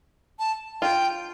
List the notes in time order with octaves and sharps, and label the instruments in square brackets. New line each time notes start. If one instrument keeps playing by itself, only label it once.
[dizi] A5
[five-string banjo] F4 [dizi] G5